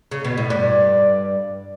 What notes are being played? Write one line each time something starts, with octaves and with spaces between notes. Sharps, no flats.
C#3
B2
A2
G2 D5